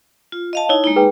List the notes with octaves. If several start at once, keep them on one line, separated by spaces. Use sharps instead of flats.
F4
D#5 F5 A5
D#4 E4 C#5
G#3 A#3 D#4
G#4 B4 G5